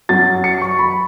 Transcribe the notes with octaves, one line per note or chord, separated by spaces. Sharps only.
F#2 F#3 A6
C#7
C#6
B5